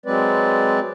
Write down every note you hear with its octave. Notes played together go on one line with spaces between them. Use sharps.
F#3 G#3 C4 B4 D5